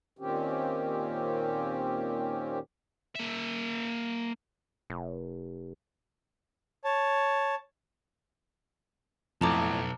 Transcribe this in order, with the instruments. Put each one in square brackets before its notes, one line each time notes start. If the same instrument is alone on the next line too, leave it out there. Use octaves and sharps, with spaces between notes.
[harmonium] D#2 A#2 D#3 C4 C#4 G4
[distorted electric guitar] A#3 E5
[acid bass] F1
[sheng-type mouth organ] C#5 A5
[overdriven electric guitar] B1 [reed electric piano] F2 [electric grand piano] A2 F3 [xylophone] A5 A#5 D6